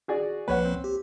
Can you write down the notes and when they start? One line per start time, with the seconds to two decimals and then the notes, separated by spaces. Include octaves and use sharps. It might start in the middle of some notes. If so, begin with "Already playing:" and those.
0.08 F#4 G#4 D5
0.48 C2 F3 A#3 B4 C#5 F#5
0.65 C4
0.84 G4